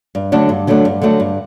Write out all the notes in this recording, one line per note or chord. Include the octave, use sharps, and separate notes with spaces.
G2
D3 F#3 A3 D4
G2
D3 F#3 A3 D4
G2
D3 F#3 A3 D4
G2